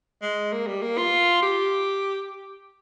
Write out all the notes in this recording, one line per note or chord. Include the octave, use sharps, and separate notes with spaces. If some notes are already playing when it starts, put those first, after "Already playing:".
G#3
A#3
G3
A#3
F4
G4